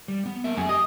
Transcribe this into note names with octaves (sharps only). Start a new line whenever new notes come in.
G3
B3
A#3 A#4 E5
F#2 A3 G#4 G#5
G4 D#5